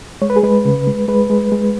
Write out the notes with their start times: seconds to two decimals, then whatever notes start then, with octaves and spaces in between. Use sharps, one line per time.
0.22 G#3 C#5
0.30 B4
0.36 G#4
0.43 G#3 B4
0.65 C#3
0.87 G#3
1.08 G#3 B4
1.30 G#3
1.52 G#3